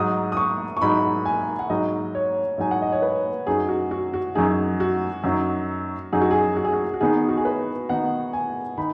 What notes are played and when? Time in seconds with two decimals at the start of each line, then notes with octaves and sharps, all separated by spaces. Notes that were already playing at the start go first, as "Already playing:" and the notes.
Already playing: G#2 F#3 D#4 D#6
0.32 D#6
0.37 C#6
0.77 C#6
0.81 G#2 F#3 D#4 B5
1.25 G#5
1.59 F#5
1.70 G#2 F#3 D#4 D#5
2.15 C#5
2.58 G#2 F#3 D#4 G#5
2.71 F#5
2.82 D#5
2.92 C#5
3.02 B4
3.47 F#2 F#3 D#4 G#4
3.69 F#4
3.91 F#4
4.14 F#4
4.35 F#2 F#3 D#4 G#4
4.80 F#4
5.24 F#2 F#3 D#4
6.13 F#2 F#3 D#4 G#4
6.21 F#4
6.31 G#4
6.56 F#4
6.65 G#4
6.73 F#4
6.94 F#4
7.01 D#3 B3 D#4 G#4
7.29 F#4
7.37 G#4
7.45 B4
7.89 D#3 B3 D#4 F#5
8.33 G#5
8.78 D#3 D#4 B5